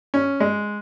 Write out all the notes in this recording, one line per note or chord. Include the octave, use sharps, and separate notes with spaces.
C#4
G#3